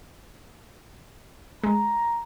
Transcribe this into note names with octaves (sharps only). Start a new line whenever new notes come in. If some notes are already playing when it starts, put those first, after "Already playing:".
G#3 A#5